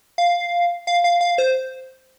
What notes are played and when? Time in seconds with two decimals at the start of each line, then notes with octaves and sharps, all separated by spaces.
0.18 F5
0.87 F5
1.04 F5
1.21 F5
1.38 C5